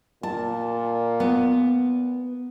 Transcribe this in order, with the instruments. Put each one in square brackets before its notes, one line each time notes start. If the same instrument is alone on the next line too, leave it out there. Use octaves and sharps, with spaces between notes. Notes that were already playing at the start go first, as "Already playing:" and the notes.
[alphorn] A#2 [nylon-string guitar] A5
[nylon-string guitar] B3